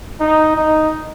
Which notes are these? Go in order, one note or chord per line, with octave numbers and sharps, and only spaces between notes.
D#4
D#4